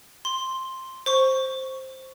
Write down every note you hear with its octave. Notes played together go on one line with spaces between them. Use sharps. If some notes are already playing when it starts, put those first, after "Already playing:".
C6
C5 C#6